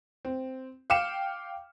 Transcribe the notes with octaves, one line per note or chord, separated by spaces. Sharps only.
C4
F5 G5 D6 F6 C#7 E7